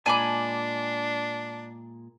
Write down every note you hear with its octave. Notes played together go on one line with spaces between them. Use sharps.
A#2 G#3 D4 G#5 A5 B5 D6